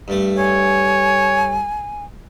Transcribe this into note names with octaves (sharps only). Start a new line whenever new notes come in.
G2 A3
C#5 G#5